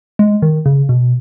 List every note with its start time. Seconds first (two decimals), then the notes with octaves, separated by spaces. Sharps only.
0.19 G#3
0.42 D#3
0.66 C#3
0.89 B2